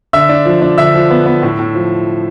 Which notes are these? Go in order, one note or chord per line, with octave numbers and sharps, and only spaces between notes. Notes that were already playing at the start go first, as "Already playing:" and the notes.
D3 E5 E6
D4
F3
D4
D3 E5 E6
F3
B3
B3
A2
A2
F3